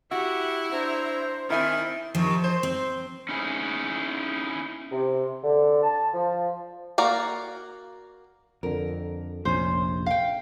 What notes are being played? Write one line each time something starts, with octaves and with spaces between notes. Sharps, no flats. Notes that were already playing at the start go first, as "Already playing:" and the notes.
E4 F#4 G4 F#5
D4 C5 A#5
D#3 C4 E4 E5 G#5 A6
C3 D#3 F3
C5
C4
C#4 D#4 E4 G#4
C3
D3
A5
F3
A#3 F#4 D5 F5
F2 D3 A#4
F1 A#1 F2 C#4 C5
F5 G5